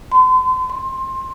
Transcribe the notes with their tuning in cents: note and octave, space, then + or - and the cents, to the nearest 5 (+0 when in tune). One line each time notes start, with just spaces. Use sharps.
C6 -40
C6 +20